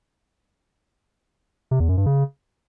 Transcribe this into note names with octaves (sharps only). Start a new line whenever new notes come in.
C3
E2
F#2
G2
C#3